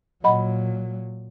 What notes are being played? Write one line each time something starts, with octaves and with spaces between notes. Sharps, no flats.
A#2 F#3 D#5 F#5 B5